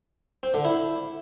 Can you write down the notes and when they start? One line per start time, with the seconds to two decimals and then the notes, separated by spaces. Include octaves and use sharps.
0.43 C4
0.54 D3
0.65 E4